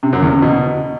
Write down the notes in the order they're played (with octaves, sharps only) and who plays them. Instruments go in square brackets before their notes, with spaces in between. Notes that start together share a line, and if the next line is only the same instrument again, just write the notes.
[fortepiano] C3
F#2
E2
C#3
B2